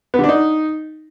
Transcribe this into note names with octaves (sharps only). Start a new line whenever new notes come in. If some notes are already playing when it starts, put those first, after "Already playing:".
B3
D3
D4
D#4